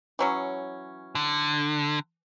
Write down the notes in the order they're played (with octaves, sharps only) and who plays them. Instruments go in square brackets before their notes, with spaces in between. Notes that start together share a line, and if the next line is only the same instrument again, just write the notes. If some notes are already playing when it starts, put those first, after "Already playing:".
[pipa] E3 F#3 C#4
[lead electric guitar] D3